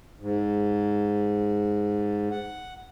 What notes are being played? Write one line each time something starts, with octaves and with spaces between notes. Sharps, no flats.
G#2
F#5